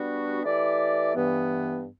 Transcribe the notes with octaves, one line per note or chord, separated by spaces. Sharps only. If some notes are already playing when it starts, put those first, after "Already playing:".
Already playing: G3 B3 D4 F#4
E3 A3 E4 G4 D5
G2 E3 B3